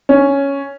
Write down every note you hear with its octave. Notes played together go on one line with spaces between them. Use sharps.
C#4